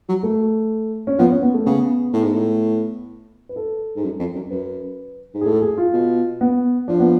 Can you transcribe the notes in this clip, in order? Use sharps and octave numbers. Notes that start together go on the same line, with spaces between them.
F#3
A3
C#4
F3 B3
C#4
B3
A3
C#3 B3
A2
G#2
A2
B4
A4
G#2
F#2
F2
F#2
F#2 B4
G#2
G#4
A2 A4
G#4
F4
B2
B3
F3 D4
B3